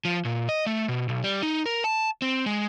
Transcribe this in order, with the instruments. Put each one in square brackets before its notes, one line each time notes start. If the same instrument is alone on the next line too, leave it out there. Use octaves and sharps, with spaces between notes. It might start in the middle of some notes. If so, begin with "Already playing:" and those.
[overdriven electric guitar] F3
A#2
D#5
A3
B2
B1
G3
D#4
A#4
A5
C4
G#3